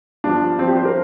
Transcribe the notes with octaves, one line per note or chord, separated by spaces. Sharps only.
G2 F3 D4
C4
G4
C5
A#4